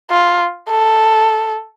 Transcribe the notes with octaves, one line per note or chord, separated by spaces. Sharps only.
F4
A4